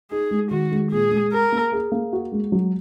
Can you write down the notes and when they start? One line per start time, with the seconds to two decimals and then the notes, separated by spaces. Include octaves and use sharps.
0.11 D#4 G#4
0.31 G#3
0.51 D#3 F#4
0.72 G#3
0.91 A#2 G#4
1.12 G#3
1.32 G#4 A#4
1.52 A#3
1.72 G#4
1.92 A#3
2.13 F#4
2.32 G#3
2.52 F#3